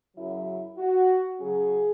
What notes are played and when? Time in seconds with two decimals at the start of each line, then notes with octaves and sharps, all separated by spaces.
0.16 F#2 C#3 F#3 E4
0.78 F#4
1.40 C#3 F#3 C#4 G#4